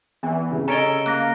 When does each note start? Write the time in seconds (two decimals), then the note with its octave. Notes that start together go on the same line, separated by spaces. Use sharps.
0.23 E2 E3
0.51 C2 C#3
0.68 C#4 A4 C#5 D#5 A#5 D7 G7
1.06 A#3 F#6 A#6